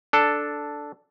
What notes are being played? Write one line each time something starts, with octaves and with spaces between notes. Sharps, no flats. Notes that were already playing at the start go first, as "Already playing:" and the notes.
D4 A4